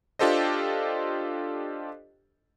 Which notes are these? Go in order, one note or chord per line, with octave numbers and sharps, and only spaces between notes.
D4 F4 G4 A4 C5 D#5